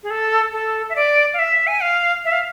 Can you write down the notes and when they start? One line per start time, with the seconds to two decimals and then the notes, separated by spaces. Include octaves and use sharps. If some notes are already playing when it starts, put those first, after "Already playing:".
0.03 G#4
0.10 A4
0.52 A4
0.90 E5
0.96 D5
1.34 F5
1.39 E5
1.67 G#5
1.82 F5
2.25 E5
2.32 F5